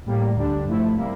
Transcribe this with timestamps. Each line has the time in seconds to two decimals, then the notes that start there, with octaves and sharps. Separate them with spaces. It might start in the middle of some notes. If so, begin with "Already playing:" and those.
0.05 A1 A2 G3 A#3
0.35 D2 D3 G3 D4
0.65 G2 F3 A3 E4
0.96 C3 G3 A#3 E4